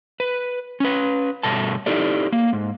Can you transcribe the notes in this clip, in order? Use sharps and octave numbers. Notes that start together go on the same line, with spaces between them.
B4
C#4 B4
G2 B2 A4 A5
D#4 E4 G4 A4 D5
A#3
G#2